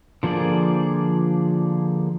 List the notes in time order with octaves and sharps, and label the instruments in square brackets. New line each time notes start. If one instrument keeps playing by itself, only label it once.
[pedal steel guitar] D3 F3 A#3 G#4 D5